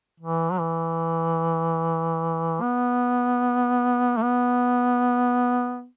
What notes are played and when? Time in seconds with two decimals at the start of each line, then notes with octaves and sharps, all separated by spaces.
0.20 E3
0.52 F#3
0.60 E3
2.61 B3
4.17 A3
4.22 B3